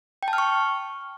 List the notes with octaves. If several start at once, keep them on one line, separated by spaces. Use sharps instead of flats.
G5
A5
F6
C#6